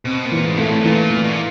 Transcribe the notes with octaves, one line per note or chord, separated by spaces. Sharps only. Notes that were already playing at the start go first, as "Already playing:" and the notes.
B2 C4
A#2
E3
G#2
A#2 A3
A2
A2
A#2 E3
E3
B2
A#2